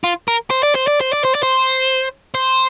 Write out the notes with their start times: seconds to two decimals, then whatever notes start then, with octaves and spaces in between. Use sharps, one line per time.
0.04 F4
0.28 A#4
0.50 C5
0.63 D5
0.75 C5
0.87 D5
1.00 C5
1.13 D5
1.24 C5
1.35 D5
1.43 C5
2.34 C5